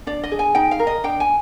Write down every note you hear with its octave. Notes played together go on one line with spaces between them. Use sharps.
D4 D5
D#5
G#4
G#5
D#4 G5
F5
A#4
D#5
D4 G5
G#5